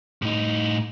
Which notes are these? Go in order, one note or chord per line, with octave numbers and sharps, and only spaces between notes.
A2 D#4